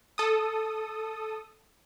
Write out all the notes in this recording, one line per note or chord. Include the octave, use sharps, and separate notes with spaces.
A4 D#6